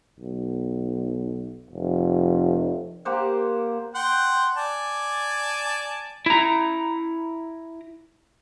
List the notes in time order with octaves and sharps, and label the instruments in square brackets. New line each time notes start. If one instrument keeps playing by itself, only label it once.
[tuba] B1
F1
[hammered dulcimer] A#3 G4 C5 F#5
[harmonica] F#5 G5 C6
D5 G#5 A5
[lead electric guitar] E4 A#5